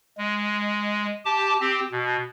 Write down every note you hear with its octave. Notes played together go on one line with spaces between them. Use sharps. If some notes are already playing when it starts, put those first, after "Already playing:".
G#3
G4 A5 D6
C4 G4
B2